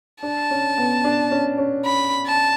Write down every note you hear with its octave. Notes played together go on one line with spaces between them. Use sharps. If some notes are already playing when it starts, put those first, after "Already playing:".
D4 A5
C#4
B3
D4
C#4
C#4
B5
A5